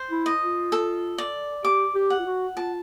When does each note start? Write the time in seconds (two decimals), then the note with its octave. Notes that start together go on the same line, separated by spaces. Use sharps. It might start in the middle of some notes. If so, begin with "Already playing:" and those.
Already playing: C5
0.11 E4
0.26 D#5
0.42 F4
0.72 A4
1.18 D5
1.64 G4 D6
1.95 G4
2.10 F#5
2.19 F4
2.26 F#4
2.56 F4 A5